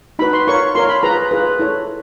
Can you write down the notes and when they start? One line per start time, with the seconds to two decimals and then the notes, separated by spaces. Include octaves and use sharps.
0.19 D#4 F#4 B4 B5
0.33 C6
0.47 F4 A#4 C#5 C#6
0.75 F4 A#4 C#5 C6
0.89 B5
1.03 F4 G#4 B4 A#5
1.31 F4 G#4 B4
1.59 E4 A4 C#5